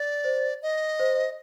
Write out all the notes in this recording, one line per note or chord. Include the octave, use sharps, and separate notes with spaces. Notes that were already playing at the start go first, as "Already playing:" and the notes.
Already playing: D5
C5
D#5
C5